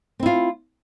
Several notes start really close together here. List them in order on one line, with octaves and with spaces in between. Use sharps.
C4 E4 F4